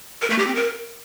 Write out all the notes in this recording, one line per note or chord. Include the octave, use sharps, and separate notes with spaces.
A#4
A3
G4
C4
A#4